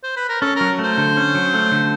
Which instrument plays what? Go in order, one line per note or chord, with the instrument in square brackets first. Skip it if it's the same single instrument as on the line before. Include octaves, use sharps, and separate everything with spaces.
[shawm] C5
B4
A#4
[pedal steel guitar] C#4 [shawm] A4
[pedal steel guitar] F#3 [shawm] A#4
[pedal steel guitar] A3
[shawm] C5
[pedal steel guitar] D3
C#4
F#3
A3
D3